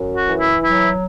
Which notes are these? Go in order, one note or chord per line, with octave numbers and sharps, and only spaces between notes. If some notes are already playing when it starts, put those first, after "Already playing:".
Already playing: F#2
F#4
E3
E4
F#3 E4